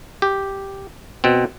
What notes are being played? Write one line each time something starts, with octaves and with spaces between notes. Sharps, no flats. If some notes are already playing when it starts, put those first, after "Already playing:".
G4
B2 C4